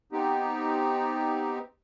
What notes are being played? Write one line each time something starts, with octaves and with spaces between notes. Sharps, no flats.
B3 C4 D#4 G4